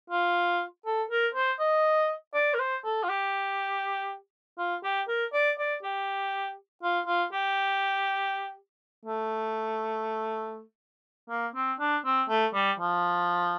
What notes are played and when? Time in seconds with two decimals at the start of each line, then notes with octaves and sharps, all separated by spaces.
0.10 F4
0.86 A4
1.11 A#4
1.35 C5
1.60 D#5
2.34 D5
2.54 A#4
2.59 C5
2.85 A4
3.03 F4
3.09 G4
4.58 F4
4.84 G4
5.08 A#4
5.34 D5
5.58 D5
5.83 G4
6.83 F4
7.07 F4
7.32 G4
9.06 A3
11.30 A#3
11.55 C4
11.80 D4
12.05 C4
12.29 A3
12.54 G3
12.79 F3